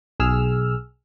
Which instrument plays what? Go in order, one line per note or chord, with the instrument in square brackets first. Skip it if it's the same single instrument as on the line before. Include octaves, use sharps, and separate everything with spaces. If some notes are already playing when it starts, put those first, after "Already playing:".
[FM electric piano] B1 G#4 E6 F6